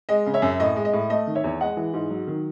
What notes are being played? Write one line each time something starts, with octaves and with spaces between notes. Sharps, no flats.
G#3 D#5
C#3
C#5 E5
F#2
A2 D#5
G#3
D#5
A2
A3 D#5
D#3
C#5 E5
E2
G#3 D#5 F#5
E3
G#2
F#3
D#3